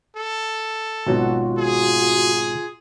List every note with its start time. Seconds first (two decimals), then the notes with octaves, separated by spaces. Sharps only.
0.17 A4
1.07 G#1 B2 F#3 F4 F#4
1.58 G#4